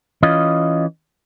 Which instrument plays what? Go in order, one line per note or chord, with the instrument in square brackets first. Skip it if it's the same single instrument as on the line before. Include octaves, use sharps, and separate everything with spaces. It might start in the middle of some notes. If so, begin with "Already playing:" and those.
[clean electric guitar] E3 C#4 F4 D#5